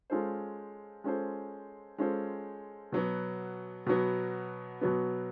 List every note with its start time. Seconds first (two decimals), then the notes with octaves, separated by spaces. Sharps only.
0.10 G#3 C#4 F4 A4 C5
1.04 G#3 C#4 F4 A4 C5
1.98 G#3 C#4 F4 A4 C5
2.92 B2 F#3 B3
3.86 B2 F#3 B3
4.81 B2 F#3 B3